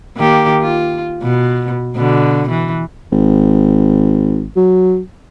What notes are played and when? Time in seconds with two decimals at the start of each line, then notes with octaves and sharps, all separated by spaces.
0.17 D#3 A#3 G4
0.62 F4
1.22 B2
1.95 B2 D3
2.49 E3
3.12 G#1
4.56 F#3